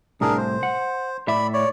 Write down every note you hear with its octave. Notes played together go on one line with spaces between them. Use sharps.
C2 A2 D4 G#4 A#4
C5
F#5
A2 D5 E5 B5
C#5 D5